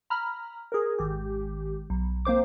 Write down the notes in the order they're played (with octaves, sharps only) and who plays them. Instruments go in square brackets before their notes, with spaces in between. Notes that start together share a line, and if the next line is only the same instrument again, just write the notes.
[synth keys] A#5 B5 F6
G#4 A#4
G#1 G4
B1
A#3 C4 C5 D6